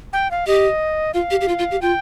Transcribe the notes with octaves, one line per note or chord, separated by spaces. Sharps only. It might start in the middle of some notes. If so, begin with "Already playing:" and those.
G5
F5
G4 D#5
F4 F5
G4
G4
F4
F4
G4
F4 G5